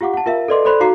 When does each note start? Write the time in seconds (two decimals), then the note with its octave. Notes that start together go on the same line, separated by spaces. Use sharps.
0.01 F4 G4 F5 F#5 D6
0.14 F#5 A5
0.26 F4 A#4 E5 F5
0.48 A4 B4 D5 D#5 C6 D6
0.65 A4 C5 D5 B5 C6 F#6
0.80 D#4 F#4 F5 A#5 D6 C7